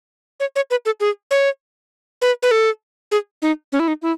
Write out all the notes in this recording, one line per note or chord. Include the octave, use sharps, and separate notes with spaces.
C#5
C#5
B4
A4
G#4
C#5
B4
B4
A4
G#4
D#4
C#4
E4
D#4
E4